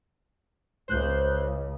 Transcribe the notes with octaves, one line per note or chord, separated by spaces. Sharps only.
C#2 C#3 C5 F#6 G6